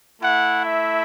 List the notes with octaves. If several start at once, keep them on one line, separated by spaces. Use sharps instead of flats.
A3 E4 F#5
E5